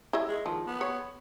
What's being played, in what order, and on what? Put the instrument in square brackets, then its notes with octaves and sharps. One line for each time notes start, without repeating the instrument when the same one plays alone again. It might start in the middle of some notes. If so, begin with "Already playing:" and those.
[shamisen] E4 D#5 E5
[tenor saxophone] G#3
[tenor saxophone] D#3 [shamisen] F3
[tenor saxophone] B3
[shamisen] C#5